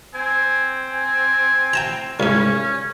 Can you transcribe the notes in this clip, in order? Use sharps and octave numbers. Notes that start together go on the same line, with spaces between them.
C4 G#5
G#5
G5 A5 A#5
C2 G#2 C#4